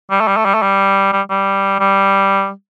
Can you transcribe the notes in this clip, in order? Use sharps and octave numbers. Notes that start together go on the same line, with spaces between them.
G3
A3
G3
A3
G3
A3
G3
G3
G3
G3